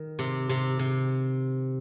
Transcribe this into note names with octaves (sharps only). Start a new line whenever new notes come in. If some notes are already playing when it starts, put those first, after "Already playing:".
Already playing: D#3
C3
C3
C3